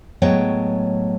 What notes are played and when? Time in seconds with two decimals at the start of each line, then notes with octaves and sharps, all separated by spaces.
0.22 A2 F#3 G#3 B3 C#5 G5